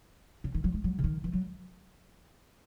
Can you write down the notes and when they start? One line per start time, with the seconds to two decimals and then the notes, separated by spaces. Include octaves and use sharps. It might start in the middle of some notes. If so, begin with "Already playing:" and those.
0.44 C#3
0.54 D#3
0.64 F#3
0.74 G#3
0.84 F#3
0.99 C#3
1.04 D#3
1.24 E3
1.33 F#3